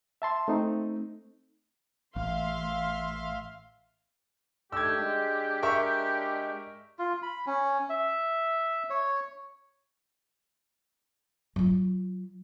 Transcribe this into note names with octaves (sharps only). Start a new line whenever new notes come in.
E5 A5 C6
A3 C4 D#4
A1 E5 F5 C6
D#3 A3 D4 G4 E6 G#6
G#3
A#4 E5 C#6
F4
B5
C#4
E5
C#5
F#3 F4